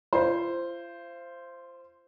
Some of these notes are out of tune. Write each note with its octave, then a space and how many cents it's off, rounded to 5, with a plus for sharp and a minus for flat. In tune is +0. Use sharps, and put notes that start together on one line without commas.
F4 -35 C5 +0